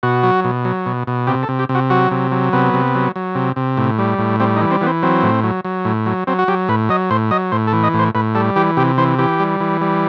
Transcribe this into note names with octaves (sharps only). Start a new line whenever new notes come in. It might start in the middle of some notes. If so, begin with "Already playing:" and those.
B2 F#4
F#3
B2
F#3
B2
B2
C3 G4
A4
C3
G4
C3
F#4
F#3 F#4
C3
F#3
C3 B3
C3
F#3
F#3
C3
C3
A2
G3
A2
G3 C4
D#4
E3
C4
E3 B3
C4
F#3 C4
A2
F#3
F#3
A2
F#3
F#3 C4
F#4
F#3 G4
A2 B4
F#3 D#5
A2 C5
F#3 D#5
A2 C5
A4
E3
D#5
A2
C5
A2 B4
G3 A4
E3 G4
C3 G4
E3 C5
E3 G4
G3
E3
G3